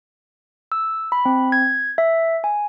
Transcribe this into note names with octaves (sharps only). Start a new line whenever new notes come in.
E6
B5
C4
G#6
E5
G#5